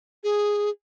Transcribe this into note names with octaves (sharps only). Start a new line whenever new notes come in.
G#4